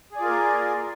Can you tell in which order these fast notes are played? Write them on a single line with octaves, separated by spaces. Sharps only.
G#4 D5 F4 A#4 A#3